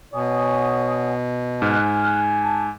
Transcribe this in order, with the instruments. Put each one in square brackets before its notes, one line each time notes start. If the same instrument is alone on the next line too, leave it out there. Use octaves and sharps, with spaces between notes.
[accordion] B2 [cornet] C#5 [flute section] F#5 G#5 D#6
[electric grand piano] G#2 [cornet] G#5 [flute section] F6 F#6
[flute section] A5